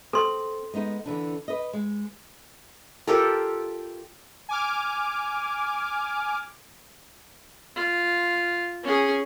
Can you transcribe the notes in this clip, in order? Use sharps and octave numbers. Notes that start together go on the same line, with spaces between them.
C4 A4 C6
G#3 B3 D#4
D3 E3 D4
B4 D#5
G#3
F4 G4 A4 A#4
G#5 D6 F6
F4
C#4 G#4